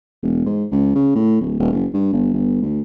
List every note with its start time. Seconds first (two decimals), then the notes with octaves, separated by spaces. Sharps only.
0.23 E1
0.46 G#2
0.71 C#2
0.95 C#3
1.15 A2
1.41 D1
1.60 D#1
1.72 F#1
1.94 G2
2.13 G1
2.33 G1
2.62 D2